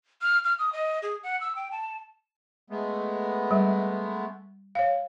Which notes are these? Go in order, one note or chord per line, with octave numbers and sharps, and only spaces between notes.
F6
F6
D#6
D#5
G#4
F#5
E6
G5
A5
G#3 A3 B3
G3
C#5 F5